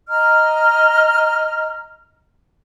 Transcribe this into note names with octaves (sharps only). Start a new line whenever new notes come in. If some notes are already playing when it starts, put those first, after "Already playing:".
D#5 A#5 F6